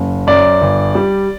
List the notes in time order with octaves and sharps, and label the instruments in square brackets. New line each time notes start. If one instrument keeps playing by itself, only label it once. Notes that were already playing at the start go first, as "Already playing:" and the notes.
Already playing: [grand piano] F#1
F#2 D5
G1
G3